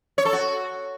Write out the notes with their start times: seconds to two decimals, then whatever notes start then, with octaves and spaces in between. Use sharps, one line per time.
0.18 C#5
0.25 A4
0.33 F#4